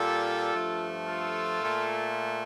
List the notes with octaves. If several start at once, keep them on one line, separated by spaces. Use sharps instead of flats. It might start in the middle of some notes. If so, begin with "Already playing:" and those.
Already playing: A#2 G3 F4 A4
G2 F3 A3
F4 A4
A#2 A3